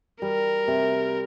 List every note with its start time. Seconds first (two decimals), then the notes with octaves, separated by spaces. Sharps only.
0.22 G3 A#4
0.68 C3